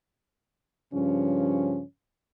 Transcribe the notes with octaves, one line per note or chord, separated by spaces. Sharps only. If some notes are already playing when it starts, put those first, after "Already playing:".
G2 C#3 F3 C#4